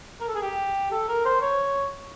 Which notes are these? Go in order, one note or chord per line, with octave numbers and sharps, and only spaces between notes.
A#4
A4
G#4
G4
A4
A#4
C5
C#5